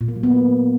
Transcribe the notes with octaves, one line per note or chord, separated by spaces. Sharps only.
A#2
A#3
F#3
B3
A#3